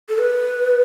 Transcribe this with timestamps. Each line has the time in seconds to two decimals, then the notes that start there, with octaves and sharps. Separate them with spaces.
0.09 A4
0.19 B4